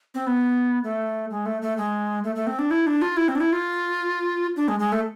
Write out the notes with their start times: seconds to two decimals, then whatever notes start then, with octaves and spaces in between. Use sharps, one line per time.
0.14 C4
0.27 B3
0.84 A3
1.31 G#3
1.46 A3
1.62 A3
1.77 G#3
2.24 A3
2.35 A3
2.47 C4
2.59 D4
2.71 E4
2.87 D4
3.02 F4
3.17 E4
3.28 C4
3.35 D4
3.40 E4
3.53 F4
4.56 D4
4.68 G#3
4.79 G#3
4.92 A3